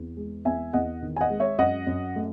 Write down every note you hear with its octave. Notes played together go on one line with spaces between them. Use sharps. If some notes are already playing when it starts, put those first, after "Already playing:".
Already playing: E2
G#3
E2 E5 G#5
E2 D#5 F#5
D#3
G#5
D#5 F#5
G#3
C#5 E5
F#2 D#5 F#5
F#2
A3